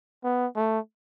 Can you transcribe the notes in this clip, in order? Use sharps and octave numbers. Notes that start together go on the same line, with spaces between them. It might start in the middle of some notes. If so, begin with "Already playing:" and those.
B3
A3